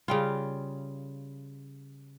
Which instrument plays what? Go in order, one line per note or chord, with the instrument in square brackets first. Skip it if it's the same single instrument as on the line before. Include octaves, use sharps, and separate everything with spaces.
[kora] C#3 G3 F4